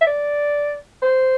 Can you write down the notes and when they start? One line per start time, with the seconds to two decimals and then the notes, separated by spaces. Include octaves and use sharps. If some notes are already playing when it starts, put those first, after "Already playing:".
0.01 E5
0.07 D5
1.02 C5